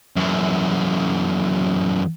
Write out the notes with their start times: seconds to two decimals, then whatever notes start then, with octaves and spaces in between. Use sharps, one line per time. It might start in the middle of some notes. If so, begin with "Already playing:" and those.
0.16 F#2 E3